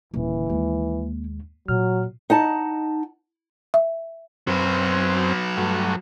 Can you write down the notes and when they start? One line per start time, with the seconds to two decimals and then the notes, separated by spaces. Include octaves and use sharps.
0.14 D#1 D3 E3
0.49 D#2 G#3 A#3
1.68 A#2 F#3 F6
2.30 D#4 F#5 A5
3.74 E5
4.47 F#2 F#3 C4 B4
5.57 G2 A3 F#4